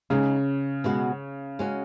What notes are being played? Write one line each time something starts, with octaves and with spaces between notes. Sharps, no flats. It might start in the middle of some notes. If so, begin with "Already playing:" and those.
C#3 G#3 D#4 G#4
B2 G#3 B3 F#4
G#3 C#4 F#4